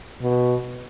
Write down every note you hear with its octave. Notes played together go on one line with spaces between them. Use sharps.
B2